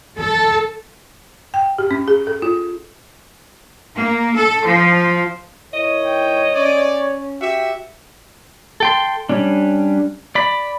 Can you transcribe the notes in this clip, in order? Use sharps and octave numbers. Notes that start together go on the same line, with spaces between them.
A4
G5
G4
C#4
G#4
A4
F4
A#3
A4
F3
G#2 E4 A#4 C#5 D#5
G5
C#4 D5
F#4 G4 E5
A4 G5 C6
G3 C#4 D4
D5 B5